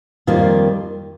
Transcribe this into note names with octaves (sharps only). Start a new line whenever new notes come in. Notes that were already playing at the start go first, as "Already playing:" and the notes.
F2 D#3 G3 A#3 F4